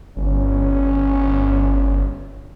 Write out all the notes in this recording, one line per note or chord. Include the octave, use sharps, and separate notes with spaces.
G1 C#4